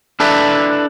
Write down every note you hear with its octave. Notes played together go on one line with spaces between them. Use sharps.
D4 E4 A4 B4 D5 E5